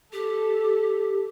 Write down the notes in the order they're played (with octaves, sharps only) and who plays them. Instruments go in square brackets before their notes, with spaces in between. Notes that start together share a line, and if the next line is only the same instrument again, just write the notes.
[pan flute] G4 [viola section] A4